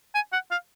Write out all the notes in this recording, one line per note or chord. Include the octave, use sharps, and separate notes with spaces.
G#5
F#5
F5